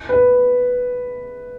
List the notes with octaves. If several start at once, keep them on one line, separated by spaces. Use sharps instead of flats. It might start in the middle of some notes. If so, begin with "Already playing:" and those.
B4